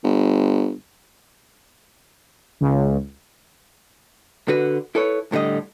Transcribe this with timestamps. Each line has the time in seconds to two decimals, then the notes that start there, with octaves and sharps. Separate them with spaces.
0.04 G1
2.61 C#2
4.48 D3 F#4 B4
4.95 E4 A4 B4 C#5
5.32 A2 D3 G3 D#5